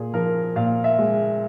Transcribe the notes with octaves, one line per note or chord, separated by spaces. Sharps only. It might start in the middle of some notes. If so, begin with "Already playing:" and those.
Already playing: A#2 G#4
F3 A#4
A#2 F5
E5
G#3